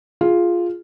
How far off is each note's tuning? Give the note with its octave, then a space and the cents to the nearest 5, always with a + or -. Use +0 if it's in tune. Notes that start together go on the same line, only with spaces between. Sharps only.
F4 +0 G#4 +0